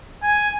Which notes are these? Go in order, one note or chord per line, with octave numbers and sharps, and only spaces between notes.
G#5